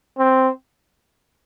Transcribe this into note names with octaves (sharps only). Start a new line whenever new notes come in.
C4